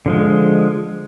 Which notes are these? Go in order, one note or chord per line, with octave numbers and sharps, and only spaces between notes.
D3 F3 G#3